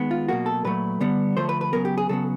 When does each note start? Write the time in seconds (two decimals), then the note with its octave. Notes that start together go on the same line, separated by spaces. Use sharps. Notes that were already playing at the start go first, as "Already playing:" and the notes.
Already playing: D#3 G#3 B3
0.11 F4
0.28 B2 F#3 A#3 F#4
0.46 A4
0.65 A#2 F#3 A3 B4
1.01 D3 G3 B3
1.37 D3 F3 A3 C5
1.49 B4
1.61 B4
1.73 C#3 F#3 B3 A#4
1.85 G4
1.98 G#4
2.09 C#3 F#3 B3 A4